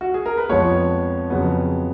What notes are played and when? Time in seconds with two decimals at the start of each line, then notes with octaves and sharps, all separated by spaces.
0.01 F#4
0.14 G#4
0.26 A#4
0.38 B4
0.49 F2 F3 G#3 B3 C#5
1.30 F2 C#3 F#3 B3